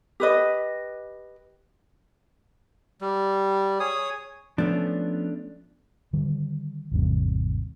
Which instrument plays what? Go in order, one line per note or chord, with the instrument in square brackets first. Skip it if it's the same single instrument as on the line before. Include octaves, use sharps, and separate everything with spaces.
[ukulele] G4 B4 D#5
[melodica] G3
G#4 C#5 D#6
[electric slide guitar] F3 B3 C#4 [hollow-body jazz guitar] A3 D4
[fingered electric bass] D3 D#3 G3
G#1 E2 C3 G3